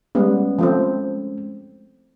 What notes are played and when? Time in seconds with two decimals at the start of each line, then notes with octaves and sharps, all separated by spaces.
0.15 G3 G#3 B3 C#4
0.59 F3 A3 C4